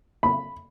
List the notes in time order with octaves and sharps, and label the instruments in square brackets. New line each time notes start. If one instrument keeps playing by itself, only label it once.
[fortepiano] B5